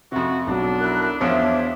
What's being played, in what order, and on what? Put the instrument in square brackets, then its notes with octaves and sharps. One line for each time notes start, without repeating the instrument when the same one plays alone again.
[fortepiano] F2 C3 [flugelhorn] F#4
[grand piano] B1 F#3 [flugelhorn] D4
[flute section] E4 A#4 F#6
[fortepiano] E2 F3 [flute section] C5 C#5 E5 [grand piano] D#6 E6 D7